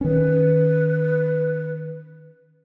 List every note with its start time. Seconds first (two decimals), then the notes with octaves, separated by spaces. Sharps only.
0.01 D#3 C#4 B4